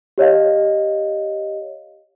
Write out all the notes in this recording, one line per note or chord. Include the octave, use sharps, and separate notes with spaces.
G4 C#5 D#5 F5